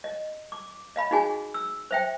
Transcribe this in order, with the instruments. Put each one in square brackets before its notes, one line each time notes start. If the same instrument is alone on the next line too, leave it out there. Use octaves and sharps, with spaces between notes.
[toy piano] D#5
D6
D#5 F5 B5
D#4 F#4 G#4 G#5
E6
C5 E5 G5